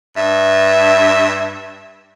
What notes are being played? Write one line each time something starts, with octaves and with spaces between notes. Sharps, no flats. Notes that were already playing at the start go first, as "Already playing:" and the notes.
G2 E5